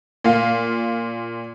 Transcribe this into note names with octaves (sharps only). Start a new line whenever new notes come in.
A#2 F5